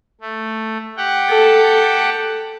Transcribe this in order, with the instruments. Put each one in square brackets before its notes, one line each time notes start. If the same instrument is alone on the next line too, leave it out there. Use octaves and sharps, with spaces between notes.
[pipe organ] A3
G4 F#5 G5
[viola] A4